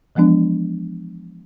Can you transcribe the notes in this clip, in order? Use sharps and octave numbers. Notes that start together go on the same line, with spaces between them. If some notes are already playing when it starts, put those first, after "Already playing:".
E3 F3 G#3 B3 D4